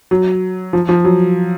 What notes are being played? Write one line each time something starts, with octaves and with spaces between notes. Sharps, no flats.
F#3
F3
F3
F#3